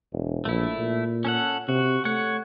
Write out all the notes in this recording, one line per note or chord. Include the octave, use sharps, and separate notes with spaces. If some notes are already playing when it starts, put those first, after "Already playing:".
E1
A#1 A3 E4
A#2
C#4 A4 F#5
C3 F#4
A3 C#5 F#5